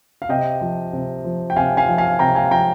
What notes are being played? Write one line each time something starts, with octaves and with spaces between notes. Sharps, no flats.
F5
C3 D#5 G5
F3
C3
F3
G5
C3 F5 G#5
F5 G#5
F3
F5 G#5
C3 G5 A#5
F5 G#5
F3 G5 A#5